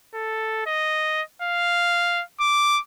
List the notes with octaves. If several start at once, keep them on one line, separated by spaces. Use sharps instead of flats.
A4
D#5
F5
D6